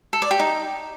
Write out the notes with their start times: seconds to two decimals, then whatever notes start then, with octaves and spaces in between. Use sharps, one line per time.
0.13 A4
0.22 D5
0.31 G4
0.40 D#4